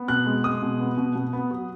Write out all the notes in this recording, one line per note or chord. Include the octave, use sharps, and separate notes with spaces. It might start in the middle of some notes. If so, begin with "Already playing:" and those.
Already playing: B3
B2 F#6
G#3
G#3 D#6
B2
B3
B2
B2
B3
F#3